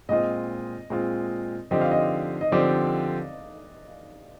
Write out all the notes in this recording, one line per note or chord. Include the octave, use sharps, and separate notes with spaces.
A#2 G#3 C4 F4 D#5
A#2 G#3 C4 F4
D3 F3 C4 G4 D#5
F5
D#5
D#5
D3 F3 C4 G4 D5